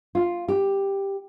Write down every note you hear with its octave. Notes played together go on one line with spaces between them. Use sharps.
F4
G4